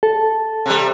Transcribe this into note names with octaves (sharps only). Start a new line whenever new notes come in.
A4
C3 G3